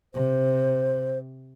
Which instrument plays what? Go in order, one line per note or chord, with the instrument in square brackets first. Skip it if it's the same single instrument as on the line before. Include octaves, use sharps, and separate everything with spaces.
[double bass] C3 [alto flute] C5